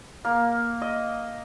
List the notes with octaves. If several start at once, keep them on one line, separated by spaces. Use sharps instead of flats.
A#3
D#5